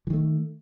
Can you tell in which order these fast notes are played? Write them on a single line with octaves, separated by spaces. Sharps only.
E3 D#3 A3